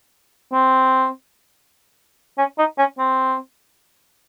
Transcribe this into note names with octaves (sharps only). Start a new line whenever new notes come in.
C4
C#4
D#4
C#4
C4